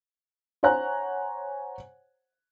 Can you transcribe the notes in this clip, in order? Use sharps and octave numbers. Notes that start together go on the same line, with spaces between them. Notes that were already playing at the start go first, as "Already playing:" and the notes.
C5 C#5 F#5 G#5 A#5 F#6